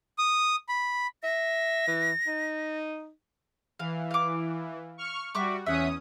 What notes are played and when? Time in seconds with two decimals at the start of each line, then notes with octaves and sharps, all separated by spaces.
0.18 D#6
0.69 B5
1.24 E5 A#6
1.87 E3
2.27 D#4
3.79 E3 F5
4.11 F5 D6
4.98 C#6 F6
5.34 G3 F#4 E5 C#6 D6
5.66 E2 C#4 E5 F#5 D#6